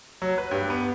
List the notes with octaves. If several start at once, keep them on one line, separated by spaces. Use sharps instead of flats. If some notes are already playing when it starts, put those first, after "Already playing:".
F#3
B4
G2
B3